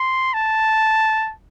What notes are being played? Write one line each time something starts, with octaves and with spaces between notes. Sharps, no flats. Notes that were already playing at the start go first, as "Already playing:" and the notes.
Already playing: C6
A5